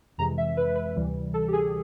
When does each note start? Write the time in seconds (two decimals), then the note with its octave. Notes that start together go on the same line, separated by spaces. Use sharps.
0.18 F2 C3 E3 G#3 A#5
0.38 E5
0.57 B4
0.76 B4
0.96 D2 C3 E3 G3
1.34 A4
1.48 G4
1.53 G#4